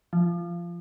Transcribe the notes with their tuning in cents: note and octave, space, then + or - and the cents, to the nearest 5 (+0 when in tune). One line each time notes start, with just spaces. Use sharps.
F3 -15